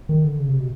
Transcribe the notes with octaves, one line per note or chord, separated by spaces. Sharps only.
D#3
D3
C#3
C3
B2